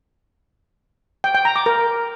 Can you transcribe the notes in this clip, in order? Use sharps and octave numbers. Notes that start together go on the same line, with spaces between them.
G5
G5
A#5
D6
A#4